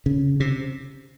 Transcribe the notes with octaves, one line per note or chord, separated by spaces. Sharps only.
C#3
C3